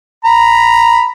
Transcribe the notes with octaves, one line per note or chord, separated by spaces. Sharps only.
A#5 B5